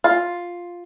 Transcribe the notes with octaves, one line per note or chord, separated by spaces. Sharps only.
F4